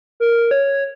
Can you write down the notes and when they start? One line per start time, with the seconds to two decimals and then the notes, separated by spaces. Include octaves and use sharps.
0.20 A#4
0.51 C#5